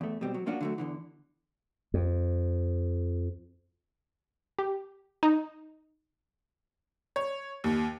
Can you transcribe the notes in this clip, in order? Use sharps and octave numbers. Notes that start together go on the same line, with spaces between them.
E2 A3
B2 G3 C4
F#3
F3 A#3 C#4 D4 F4 F#4
D3 F#3 A3
E2 D3 E3
F2
G4
D#4
C#5
D#2